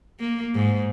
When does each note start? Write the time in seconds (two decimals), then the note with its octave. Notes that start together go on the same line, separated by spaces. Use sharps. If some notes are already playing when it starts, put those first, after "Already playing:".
0.20 A#3
0.55 G#2